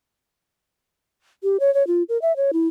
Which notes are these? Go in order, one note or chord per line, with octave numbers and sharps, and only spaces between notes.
G4
C#5
C#5
F4
A#4
E5
C#5
E4